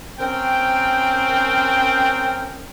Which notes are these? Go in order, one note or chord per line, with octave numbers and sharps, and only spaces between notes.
C4 C#4 A#4 G5